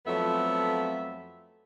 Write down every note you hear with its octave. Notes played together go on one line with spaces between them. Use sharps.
F2 F3 F#3 A3 B3 E5